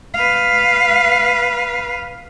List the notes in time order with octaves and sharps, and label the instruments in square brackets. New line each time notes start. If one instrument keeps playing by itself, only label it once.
[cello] B4 F5